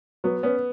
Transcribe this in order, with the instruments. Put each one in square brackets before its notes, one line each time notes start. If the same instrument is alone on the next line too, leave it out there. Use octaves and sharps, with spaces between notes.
[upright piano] F#3 [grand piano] B3
[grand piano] B3 [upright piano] C#4